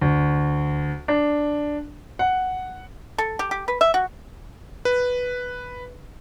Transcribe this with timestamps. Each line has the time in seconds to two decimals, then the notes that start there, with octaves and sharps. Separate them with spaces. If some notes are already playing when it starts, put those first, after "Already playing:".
0.01 D2
1.08 D4
2.19 F#5
3.18 A4
3.39 G4
3.51 G4
3.68 B4
3.81 E5
3.94 F#4
4.85 B4